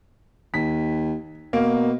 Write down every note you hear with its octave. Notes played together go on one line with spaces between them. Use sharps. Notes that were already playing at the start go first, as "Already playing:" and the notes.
D#2 B6
B2 A#3